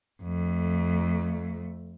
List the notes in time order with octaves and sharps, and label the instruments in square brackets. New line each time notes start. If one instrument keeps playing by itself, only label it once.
[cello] F2 A3